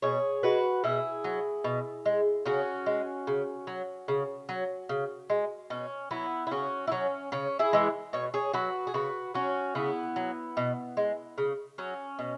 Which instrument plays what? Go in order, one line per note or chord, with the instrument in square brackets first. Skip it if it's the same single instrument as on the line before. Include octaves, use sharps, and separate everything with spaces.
[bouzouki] B2 G#4 C#5
G#3 F#4 B4
B2 E4 G#4
F#3
B2
G#3
C#3 C#4 F#4
G#3
C#3
F#3
C#3
F#3
C#3
G#3
B2 C#4
F#3 B3 E4
E4
C#3 C#4 F#4
E4
F#3 C#4
C#3 C#4
E4 G#4
E3 G#3
B2 C#5
G#4 C#5
F#3 F#4 B4
G#4
C#3 F#4 B4
F#3 C#4 F#4
C#3 B3 E4
F#3
B2
G#3
C#3
F#3 C#4
B2